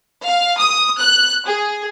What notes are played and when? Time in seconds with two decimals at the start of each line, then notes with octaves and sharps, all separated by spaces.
0.24 F5
0.56 D#6
0.98 F#6
1.45 G#4